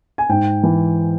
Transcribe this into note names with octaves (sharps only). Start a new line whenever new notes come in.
G#5
G#2 G5
E3